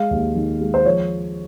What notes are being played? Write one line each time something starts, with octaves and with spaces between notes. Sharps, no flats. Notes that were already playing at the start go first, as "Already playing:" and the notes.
Already playing: G#3 F5
D#2
D#3
G#3
C5
F3 C#5